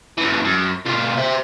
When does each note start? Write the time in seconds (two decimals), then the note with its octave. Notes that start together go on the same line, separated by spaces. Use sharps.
0.17 F#2 E3
0.45 F#2
0.85 B2 F4
1.17 C5 E5